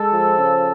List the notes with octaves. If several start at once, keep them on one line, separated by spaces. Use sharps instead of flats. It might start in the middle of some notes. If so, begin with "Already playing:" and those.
Already playing: G#3 A4
F3
C#3